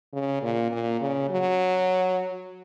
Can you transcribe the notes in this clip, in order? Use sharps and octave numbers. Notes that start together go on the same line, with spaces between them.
C#3
A#2
A#2
C#3
F#3